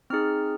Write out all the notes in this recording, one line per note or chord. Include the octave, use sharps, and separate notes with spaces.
C4 D#4 G#4 F6